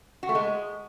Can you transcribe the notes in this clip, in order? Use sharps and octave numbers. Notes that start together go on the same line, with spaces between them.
F#4
A3
G#3